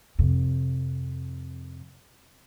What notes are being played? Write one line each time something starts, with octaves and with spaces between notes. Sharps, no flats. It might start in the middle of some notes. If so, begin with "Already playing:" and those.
F2 C3